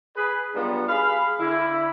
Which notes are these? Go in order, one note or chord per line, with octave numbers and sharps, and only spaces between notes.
G#4 B4
F#3 G3 B3 D4 D#4 F4
G#4 F5 B5
D3 E4